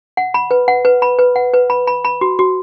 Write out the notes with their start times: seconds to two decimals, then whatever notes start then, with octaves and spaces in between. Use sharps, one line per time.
0.17 F#5
0.34 B5
0.51 B4
0.68 F#5
0.85 B4
1.02 B5
1.19 B4
1.36 F#5
1.54 B4
1.70 B5
1.87 B5
2.05 B5
2.21 F#4
2.39 F#4